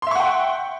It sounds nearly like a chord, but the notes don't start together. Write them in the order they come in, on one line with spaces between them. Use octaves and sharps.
C6 E5 C#6 F#5 G5